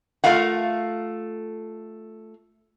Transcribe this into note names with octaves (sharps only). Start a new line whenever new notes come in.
A3 F4 A#4 F5 F#5